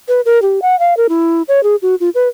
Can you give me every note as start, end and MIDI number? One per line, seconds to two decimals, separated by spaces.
0.08 0.21 71
0.25 0.41 70
0.42 0.60 67
0.62 0.78 78
0.79 0.94 77
0.97 1.07 70
1.09 1.42 64
1.48 1.62 73
1.63 1.76 68
1.82 1.95 66
2.00 2.09 65
2.15 2.28 71